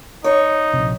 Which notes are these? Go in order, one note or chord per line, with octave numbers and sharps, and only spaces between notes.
D#4 C#5
A#1 C3